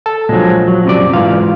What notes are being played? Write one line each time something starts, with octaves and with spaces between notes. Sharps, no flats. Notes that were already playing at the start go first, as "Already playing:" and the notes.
A4 A5
A#2 F3 F#3 G#3
F#3
F#2 C3 D5
G#2 E3 F4 F5